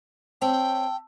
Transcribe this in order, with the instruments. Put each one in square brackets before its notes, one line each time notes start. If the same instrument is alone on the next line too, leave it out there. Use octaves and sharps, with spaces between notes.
[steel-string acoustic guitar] C4 C#5 [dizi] G5 [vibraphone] A5 E6